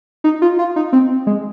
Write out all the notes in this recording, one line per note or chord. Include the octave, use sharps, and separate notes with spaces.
D#4
F4
F4
D#4
C4
G#3